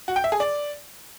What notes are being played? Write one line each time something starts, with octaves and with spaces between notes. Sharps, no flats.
F#4
G5
E5
G#4
D5